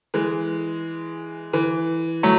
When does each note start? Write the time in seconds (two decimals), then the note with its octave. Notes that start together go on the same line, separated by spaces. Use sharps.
0.14 E3 G#3
1.53 E3
2.23 F#3 A3